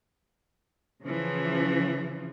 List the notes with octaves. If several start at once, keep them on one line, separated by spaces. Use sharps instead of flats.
C#3 E3 F3